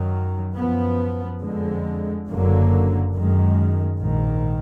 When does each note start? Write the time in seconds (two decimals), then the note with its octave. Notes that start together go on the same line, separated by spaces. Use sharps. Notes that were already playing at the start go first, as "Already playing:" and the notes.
Already playing: F#2 D#3 F#3
0.56 F#2 F3 B3
1.41 F2 D3 G#3
2.27 F#1 F#2 D3 F#3 A#3
3.13 F#2 D#3 G#3
3.99 A#1 G#2 D#3